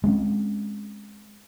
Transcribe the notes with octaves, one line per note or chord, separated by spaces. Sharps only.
G#3 C4 C#4